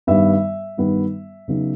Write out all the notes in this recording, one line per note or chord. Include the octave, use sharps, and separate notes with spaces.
G2 D#3 G3 B3 E5
G2 D#3 G3 B3
C#3 F#3 B3 D#4